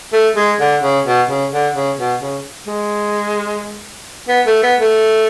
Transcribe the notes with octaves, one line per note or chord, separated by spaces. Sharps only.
A3
G#3
D3
C#3
B2
C#3
D3
C#3
B2
C#3
G#3
B3
A3
B3
A3